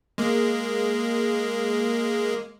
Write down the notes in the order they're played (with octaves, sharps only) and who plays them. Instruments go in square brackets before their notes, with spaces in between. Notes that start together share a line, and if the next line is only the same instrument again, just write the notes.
[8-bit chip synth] G#3 A#3